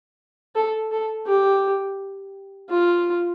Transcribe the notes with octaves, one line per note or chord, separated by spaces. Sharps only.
A4
A4
G4
F4